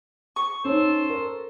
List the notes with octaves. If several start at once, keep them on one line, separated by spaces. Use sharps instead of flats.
C#6
C#4 D#4 A4 C5
A#4